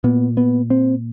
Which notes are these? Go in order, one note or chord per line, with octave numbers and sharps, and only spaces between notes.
A#2 B3
B3
C4